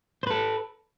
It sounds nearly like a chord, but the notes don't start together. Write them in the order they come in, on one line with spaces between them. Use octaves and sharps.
C5 B4 A4